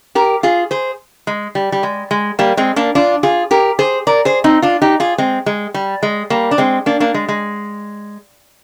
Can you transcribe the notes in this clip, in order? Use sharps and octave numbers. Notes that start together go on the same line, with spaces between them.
G4 A#4
F4 G#4
G#4 C5
G#3
G3
G3
G#3
G#3
G3 A#3
G#3 C4
A#3 D4
D4 F4
F4 G#4
G4 A#4
G#4 C5
A#4 D5
G#4 C5
C4 D#4
D4 F4
D#4 G4
F4 G#4
G#3 C4
G#3
G3
G#3
G3 A#3
D4
G#3 C4
A#3 D4
A#3 D4
G#3
G#3